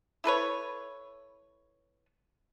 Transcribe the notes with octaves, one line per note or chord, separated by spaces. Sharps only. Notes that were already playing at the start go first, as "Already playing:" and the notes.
E4 A4 B4 C#5